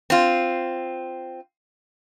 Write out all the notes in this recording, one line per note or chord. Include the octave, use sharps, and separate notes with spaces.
C4 F4